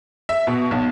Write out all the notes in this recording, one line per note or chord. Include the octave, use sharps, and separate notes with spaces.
E5
B2
B1